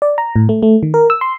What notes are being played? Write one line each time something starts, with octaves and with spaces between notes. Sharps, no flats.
D5
A#5
A2
A3
A3
D#3
A#4
E6
C6